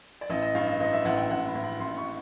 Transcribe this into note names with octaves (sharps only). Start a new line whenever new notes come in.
D5
A1 D#5
D#5
G2 F5
D#5
A1 D#5
E5
A1 F#5
G5
A1 F#5
B5
A1
B5
A1 C6
C#6